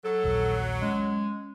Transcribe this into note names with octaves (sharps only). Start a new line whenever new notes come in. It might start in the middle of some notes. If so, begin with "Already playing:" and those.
F#3 A4
A#1 D#2
G#3 C#4